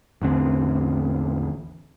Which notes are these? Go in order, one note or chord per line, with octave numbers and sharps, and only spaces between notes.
A1 E2 D3 C4